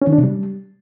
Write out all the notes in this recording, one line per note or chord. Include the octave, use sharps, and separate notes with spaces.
C#4
D#3
D4
C3
G3